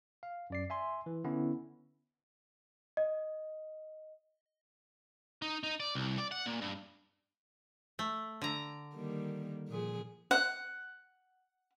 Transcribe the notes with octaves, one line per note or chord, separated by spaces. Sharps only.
F5
F#2 D5 C7
E5 G#5 C6
E3
D3 B3 C#4 E4
D#5
D#4
D#4
D5
C2
D5
F#5
A#2
G2
A3
D3 A#5
D#3 G3 A#3
A#2 F3 G#4
F#5